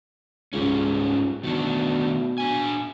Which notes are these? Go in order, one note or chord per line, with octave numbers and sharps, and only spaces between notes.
C#2 G#2 G3 C#4
B2 D#3 A3 D4
A#2 D4 G#5